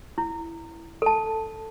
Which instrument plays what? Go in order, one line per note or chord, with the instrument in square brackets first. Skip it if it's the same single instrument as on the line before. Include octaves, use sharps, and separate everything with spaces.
[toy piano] E4
A4 A5